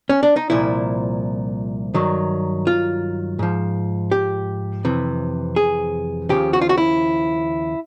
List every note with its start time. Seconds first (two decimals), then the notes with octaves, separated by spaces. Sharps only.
0.09 C#4
0.23 D4
0.36 D#4
0.50 C2 A#2 F3 E4
1.94 G2 D#3 F#3
2.67 F4
3.39 G#2 F3
4.12 G4
4.85 F2 C3 E3
5.56 G#4
6.29 D#2 C#3 F3 G4
6.53 F#4
6.61 F4
6.69 F#4
6.78 E4